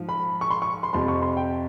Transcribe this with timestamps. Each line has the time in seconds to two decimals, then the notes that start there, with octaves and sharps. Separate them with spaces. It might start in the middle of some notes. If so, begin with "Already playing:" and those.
Already playing: G#2 F3
0.09 B5
0.41 C#6
0.50 C6
0.62 C#6
0.83 C6
0.93 F2 C3 F3 C6
1.08 C#6
1.22 C6
1.37 G5